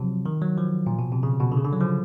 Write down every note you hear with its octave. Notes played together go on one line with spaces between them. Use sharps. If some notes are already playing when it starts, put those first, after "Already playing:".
Already playing: C3 F3 F#3
D#3
F#3
F3
A#2
B2
C3
C#3
B2
D3
C#3
D3
F#3
F3